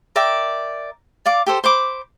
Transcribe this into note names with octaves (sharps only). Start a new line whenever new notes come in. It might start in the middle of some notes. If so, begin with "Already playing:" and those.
A#4 D5 E5 G5
D5 F5 D6
G4 A4 C5
C5 B5 D6